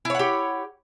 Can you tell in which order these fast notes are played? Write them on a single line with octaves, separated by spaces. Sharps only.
E4 C#5 F#5 G4